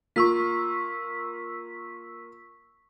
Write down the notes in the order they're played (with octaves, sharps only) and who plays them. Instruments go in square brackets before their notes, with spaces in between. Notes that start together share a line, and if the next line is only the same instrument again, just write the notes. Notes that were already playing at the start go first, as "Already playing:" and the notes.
[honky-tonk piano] A#3 F4 [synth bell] C#6 E6 B6